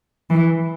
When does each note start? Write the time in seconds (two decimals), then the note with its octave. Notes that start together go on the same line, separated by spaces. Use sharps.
0.30 E3